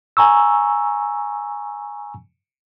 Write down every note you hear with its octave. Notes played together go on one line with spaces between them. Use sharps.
G#5 A#5 C#6 E6